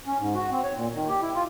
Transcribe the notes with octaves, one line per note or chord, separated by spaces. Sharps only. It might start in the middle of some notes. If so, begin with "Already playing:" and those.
C#4
G#2
F#4
C4
C#5
A#2
D#3
G4
E4
F4